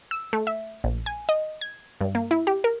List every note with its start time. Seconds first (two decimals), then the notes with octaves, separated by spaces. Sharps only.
0.11 E6
0.33 A3
0.47 E5
0.84 A#1
1.06 G#5
1.29 D#5
1.61 G#6
2.01 G2
2.15 A#3
2.31 E4
2.47 G4
2.64 A#4